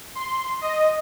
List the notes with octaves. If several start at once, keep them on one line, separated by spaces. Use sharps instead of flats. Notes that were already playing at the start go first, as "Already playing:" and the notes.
C6
D#5